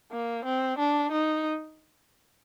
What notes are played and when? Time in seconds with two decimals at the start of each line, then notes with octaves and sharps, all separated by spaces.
0.12 A#3
0.45 C4
0.78 D4
1.11 D#4